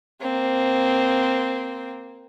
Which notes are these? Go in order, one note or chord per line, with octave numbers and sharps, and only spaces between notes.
A#3 C4